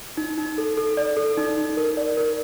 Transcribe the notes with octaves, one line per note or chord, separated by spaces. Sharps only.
D#4
D#4
A4
A4
D5
A4
D#4
D#4
A#4
D5
A#4